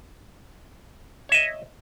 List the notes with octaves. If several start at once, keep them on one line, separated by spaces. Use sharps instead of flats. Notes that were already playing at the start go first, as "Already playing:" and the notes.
C#5 D#5 E5